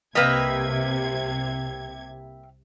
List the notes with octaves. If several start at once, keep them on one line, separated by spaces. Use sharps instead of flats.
C2 C3 A#3 G4 B4 D#5 E5 G#6